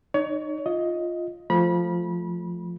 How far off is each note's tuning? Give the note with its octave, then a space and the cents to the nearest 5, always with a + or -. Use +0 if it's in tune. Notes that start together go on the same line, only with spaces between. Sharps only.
D#4 -25 C#5 +30
F4 +0 D#5 +15
F3 +0 A3 -10 B5 -30